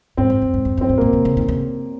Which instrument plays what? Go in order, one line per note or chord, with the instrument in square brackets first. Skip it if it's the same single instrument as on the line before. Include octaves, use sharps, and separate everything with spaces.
[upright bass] G#2 [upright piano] C4
[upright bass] F2
F#2
G#2
F2
[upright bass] F#2 [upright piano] C4
[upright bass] G#2
[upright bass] A#2 [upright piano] A#3
[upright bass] C3
C#3
D#3
C#3